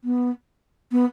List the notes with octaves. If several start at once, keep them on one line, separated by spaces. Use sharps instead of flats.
B3
B3